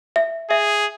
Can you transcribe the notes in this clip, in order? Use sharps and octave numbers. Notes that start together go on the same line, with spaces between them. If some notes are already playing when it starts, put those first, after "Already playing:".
E5
G#4 E5